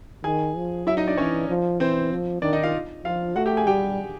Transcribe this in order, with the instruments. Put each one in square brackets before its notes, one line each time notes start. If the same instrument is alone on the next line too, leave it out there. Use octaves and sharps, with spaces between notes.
[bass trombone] D#3 [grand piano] G#4 G#5
[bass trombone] F3
[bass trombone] F#3 [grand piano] E4 E5
[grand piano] D#4 D#5
D4 D5
[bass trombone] E3 [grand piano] C#4 C#5
[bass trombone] F3
[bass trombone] E3 [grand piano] C4 C5
[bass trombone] F3
[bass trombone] D#3 [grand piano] D4 D5
[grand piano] D#4 D#5
F4 F5
[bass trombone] F3 [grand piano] F4 F5
[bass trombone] A3 [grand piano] F#4 F#5
[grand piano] G4 G5
G#4 G#5
[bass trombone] G3 [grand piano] G4 G5